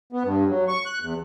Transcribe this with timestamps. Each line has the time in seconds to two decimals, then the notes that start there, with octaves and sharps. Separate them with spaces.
0.12 B3
0.24 G2
0.49 F#3
0.68 C#6
0.85 F#6
1.02 E2